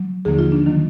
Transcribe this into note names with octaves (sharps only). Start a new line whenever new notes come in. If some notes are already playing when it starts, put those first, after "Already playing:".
Already playing: F#3
D#2 D3 F3 A#3 G#4
F4
D4
D#3 F#3 A#3